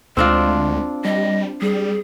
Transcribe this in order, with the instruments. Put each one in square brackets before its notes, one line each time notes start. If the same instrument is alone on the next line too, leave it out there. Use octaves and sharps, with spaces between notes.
[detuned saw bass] D2 [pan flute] G#3 [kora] C4 D4 F4
[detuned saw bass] G3 [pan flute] D#5
[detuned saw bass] G3 [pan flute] G#4